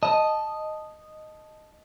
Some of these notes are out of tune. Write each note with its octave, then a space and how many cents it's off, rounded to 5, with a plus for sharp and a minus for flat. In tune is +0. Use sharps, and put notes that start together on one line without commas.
D#5 -5 A5 -5